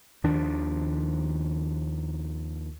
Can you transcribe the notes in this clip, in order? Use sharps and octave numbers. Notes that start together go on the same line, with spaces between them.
D#2 D#3 F3 D4